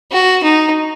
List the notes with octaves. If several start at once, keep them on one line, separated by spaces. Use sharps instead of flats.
F#4
D#4